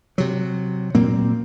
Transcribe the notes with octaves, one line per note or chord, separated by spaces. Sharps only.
C3 F#3
A#2 F#3 A#3 C4